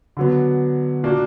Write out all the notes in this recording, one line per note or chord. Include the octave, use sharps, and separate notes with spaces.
D3 F#3 B3
A#2 A#3 D4 F#4